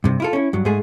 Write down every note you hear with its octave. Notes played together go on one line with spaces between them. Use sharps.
G2 C3
E4 F4 A4
C#4 E4
G2 F#3
G#2 G#3 A3 G#4